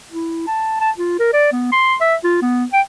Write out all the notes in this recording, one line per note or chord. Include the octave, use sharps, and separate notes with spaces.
E4
A5
A5
F4
A#4
D5
B3
C6
E5
F4
B3
G5